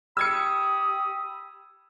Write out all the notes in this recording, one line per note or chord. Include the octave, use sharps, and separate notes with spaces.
G4 B5 D#6 E6 G#6 C#7